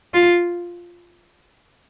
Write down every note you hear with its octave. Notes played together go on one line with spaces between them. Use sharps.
F4